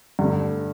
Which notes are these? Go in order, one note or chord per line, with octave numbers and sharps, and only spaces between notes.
G2 D3 A3